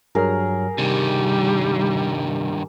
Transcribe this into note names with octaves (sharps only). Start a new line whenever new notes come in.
G2 F#3 G#4 A#4 F6
G2 C3 D#3 G3